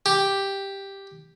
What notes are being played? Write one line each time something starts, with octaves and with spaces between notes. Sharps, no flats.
G4